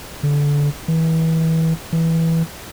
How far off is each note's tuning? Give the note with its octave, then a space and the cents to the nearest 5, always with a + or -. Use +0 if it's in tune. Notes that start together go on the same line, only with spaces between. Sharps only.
D3 -20
E3 -30
E3 -10